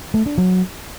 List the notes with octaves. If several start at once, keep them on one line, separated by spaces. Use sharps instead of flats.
A3
D4
F#3